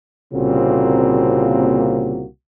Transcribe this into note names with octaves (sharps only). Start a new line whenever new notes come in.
C2 A#2 C#3 A#3 C4 F#4